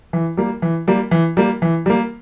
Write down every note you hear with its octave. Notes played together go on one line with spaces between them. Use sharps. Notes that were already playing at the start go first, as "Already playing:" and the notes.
E3
G3 A#3
E3
G3 A#3
E3
G3 A#3
E3
G3 A#3